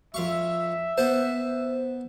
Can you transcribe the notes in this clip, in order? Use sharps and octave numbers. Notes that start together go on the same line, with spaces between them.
F2 E5 F5 C#6
B3 C5 F#5 A5